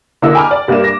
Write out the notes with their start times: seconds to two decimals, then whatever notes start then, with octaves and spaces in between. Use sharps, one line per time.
0.22 D3 A#3 E4 D#5 E5 E6
0.35 G5 G#5 A#5 B5 D6 F6
0.51 D5
0.68 G2 G3 A#3 E5 E7
0.84 D6 A#6